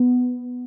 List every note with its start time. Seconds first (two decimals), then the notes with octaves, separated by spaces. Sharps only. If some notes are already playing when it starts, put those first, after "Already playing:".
Already playing: B3